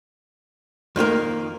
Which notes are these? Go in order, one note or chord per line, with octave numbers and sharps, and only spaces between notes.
F2 D#3 A#3 A#4